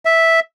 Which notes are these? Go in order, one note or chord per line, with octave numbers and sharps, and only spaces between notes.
E5